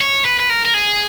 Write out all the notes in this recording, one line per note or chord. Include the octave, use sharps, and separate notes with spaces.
C#5
B4
B4
A#4
A#4
G#4